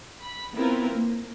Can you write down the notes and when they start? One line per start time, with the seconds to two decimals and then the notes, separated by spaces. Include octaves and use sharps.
0.22 B5
0.55 B3 C4 E4 F4 A#4 B4
0.94 A#3